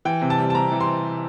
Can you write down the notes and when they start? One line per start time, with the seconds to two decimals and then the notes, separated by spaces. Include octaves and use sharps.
0.05 E3 G5
0.22 C3
0.30 A5
0.38 G3
0.50 A5
0.55 C3 A#5
0.72 E3
0.80 C6